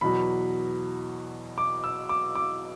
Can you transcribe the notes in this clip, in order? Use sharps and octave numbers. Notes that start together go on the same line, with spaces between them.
E2 B2 F#3 B5
D6
E6
D6
D6